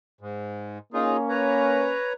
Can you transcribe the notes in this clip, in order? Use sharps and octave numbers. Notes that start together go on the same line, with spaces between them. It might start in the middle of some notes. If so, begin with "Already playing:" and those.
G#2
A#3 C#4 D#4 F4 G#4
B4 C#5 A#5